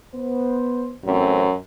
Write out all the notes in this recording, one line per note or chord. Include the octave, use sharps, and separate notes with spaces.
B3 C5
A1 F#2 A3 C4